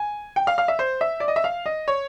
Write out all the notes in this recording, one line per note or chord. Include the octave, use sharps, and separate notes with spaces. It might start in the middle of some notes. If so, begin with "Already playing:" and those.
Already playing: G#5
G5
F5
F5
E5
C5
E5
D5
D#5
E5
F5
D#5
C#5